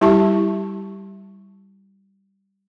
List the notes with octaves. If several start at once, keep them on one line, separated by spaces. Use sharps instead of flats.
G3 E4 G4 E5 A5 C#6